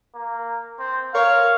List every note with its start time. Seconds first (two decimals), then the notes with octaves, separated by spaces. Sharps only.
0.15 A#3
0.79 C4
1.14 A#4 C#5 F5